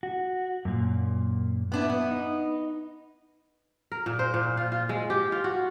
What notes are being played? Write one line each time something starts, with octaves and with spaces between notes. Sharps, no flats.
F#4
F#2 A#2
B3 D4 E4
B3
D#4
A#4
A#2
C5
A#2
F4
F4
G#3
G4
F4
F#4